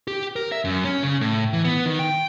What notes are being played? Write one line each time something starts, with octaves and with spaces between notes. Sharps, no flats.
G4
A#4
E5
F#2
C#4
C#3
A2
E3
B3
D#3
G5